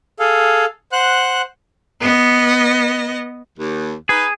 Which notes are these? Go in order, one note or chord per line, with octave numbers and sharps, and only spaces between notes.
G#4 A4 F5
C5 F#5 F#6
B3 D#5
D#2
D#4 G#4 B4